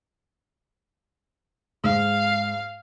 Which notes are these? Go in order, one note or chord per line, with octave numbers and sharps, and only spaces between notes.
G#2 F5